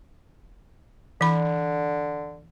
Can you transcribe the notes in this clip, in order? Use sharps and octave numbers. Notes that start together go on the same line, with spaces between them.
D3 E3 B5